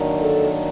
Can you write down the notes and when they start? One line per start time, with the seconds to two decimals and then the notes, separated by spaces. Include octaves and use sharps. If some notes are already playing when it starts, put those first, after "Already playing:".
Already playing: D#3 F#3 A#3 D4
0.20 A4